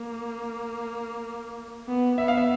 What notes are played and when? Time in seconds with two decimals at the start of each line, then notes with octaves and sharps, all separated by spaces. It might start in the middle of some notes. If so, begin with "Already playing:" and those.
Already playing: A#3
1.88 B3
2.18 B3 E5
2.28 F5
2.38 E5